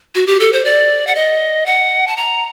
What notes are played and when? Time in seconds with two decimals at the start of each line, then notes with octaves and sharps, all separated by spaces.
0.15 F#4
0.27 G4
0.40 A4
0.53 C5
0.65 D5
1.07 F#5
1.15 D#5
1.66 F#5
2.08 A5
2.17 A#5